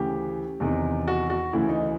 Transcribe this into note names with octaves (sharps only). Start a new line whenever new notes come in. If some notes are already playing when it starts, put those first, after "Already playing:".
Already playing: D2 C#3 E3 G4
E2 C3 D#3
F#4
F#4
D2 C#3 E3 E4
D#4